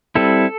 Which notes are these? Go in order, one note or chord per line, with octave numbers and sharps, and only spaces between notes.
G3 C4 E4 A4